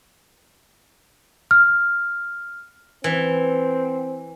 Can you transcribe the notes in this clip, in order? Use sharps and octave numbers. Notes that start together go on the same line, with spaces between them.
F6
E3 C4